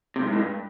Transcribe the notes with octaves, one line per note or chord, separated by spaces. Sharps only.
C3
G2
G#2
A2
G2